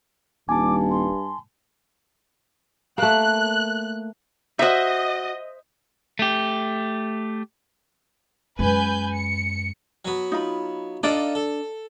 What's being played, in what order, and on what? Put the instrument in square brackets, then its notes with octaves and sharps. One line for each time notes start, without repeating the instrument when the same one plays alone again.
[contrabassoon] D#1 [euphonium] G2 [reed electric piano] G#5 A5 [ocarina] D6
[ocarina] C6
[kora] A3 A#3 [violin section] F#6
[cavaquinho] D#4 F#4 [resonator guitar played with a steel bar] C5 E5 [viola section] D#5
[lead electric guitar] A3 G4
[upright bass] F#2 G#3 [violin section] B4 G#5 G6
[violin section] C#7
[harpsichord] F#3 B3
[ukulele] D#4 F4 B5
[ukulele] D4 D5 [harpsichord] D#4 F4 A4
[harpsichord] A4